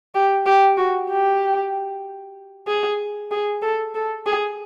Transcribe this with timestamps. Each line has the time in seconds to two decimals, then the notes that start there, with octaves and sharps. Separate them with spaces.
0.15 G4
0.46 G4
0.77 F#4
1.10 G4
2.67 G#4
3.31 G#4
3.62 A4
3.95 A4
4.26 G#4